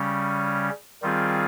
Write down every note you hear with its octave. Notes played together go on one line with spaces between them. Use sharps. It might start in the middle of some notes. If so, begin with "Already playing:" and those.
Already playing: C#3 G3 C#4
D#3 G3 C4 F4 G#4